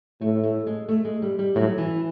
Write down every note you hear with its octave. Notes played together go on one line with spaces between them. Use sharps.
A2 A3
A3
G#3
A3
G#3
G3
G3
A2 F#3
E3